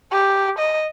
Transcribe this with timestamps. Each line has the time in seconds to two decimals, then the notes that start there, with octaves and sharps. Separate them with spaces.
0.12 G4
0.59 D#5